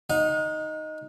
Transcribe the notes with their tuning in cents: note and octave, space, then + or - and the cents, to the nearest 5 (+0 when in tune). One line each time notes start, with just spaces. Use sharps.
D#4 +0 F#5 -45